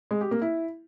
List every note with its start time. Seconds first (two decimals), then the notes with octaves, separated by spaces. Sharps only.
0.11 G#3
0.21 G4
0.31 A#3
0.42 E4